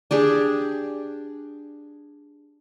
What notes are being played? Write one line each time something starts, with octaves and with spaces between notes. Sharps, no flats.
D4 G4 G#4